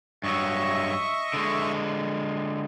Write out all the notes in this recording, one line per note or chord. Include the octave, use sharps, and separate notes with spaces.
G2 F#3 D#5 E5 C#6
D3 G#3